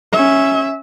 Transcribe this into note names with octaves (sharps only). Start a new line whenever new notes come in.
C#4 E5